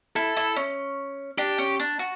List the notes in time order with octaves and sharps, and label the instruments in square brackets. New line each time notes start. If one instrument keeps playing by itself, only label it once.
[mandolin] E4 [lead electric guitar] A4
[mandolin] E4
C#4
[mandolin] D4 [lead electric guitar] G4
[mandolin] C#4
D4
F#4